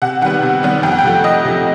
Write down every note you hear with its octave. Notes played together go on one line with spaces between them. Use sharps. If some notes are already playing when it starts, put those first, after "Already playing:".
C3 F#5
D#3 G3 B3 F#5
C3
D#3 G3 B3
F2 G5
F#5
G5
C3 F3 A3
F2 D#5
C3 F3 A3